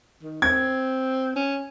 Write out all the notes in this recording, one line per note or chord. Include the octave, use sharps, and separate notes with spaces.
D#3
C4 G#6
C#4